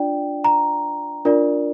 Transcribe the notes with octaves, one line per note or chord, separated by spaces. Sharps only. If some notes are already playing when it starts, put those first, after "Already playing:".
Already playing: D4 F4 D5 G5
A#5
D4 F4 A#4 D5